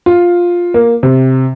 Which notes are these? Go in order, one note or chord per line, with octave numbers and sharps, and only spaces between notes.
F4
A#3
C3